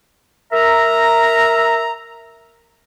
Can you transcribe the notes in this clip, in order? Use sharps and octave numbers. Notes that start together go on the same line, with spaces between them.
A#4 E5 A#5